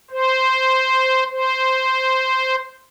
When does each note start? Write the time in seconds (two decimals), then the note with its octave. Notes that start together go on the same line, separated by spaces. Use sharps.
0.11 C5
1.31 C5